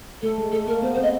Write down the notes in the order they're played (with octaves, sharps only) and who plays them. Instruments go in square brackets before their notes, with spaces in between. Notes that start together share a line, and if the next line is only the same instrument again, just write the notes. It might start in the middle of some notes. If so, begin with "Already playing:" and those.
[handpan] A3 [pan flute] A4
[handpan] G#3
[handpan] A3 [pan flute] A4
[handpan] A#3 [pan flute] A#4
[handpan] B3 [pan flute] C5
[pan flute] C5
[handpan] C4
[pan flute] D#5